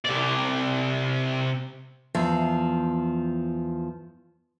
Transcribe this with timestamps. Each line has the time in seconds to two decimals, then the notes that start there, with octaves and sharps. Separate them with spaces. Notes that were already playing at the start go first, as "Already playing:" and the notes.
0.05 C3 D5
2.15 E2 F3